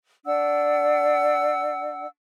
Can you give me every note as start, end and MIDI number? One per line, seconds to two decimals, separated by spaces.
0.24 2.08 62
0.24 2.08 78
0.24 2.08 88